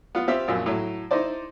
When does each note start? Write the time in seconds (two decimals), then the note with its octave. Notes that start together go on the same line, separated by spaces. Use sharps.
0.15 B3 F4
0.28 C4 F4 G4 E5 F5
0.48 A#1 F#2 F3 E6
0.66 A2 F#3
1.11 D#4 E4 C5 D5